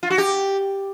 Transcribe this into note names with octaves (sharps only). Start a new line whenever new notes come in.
F4
F#4
G4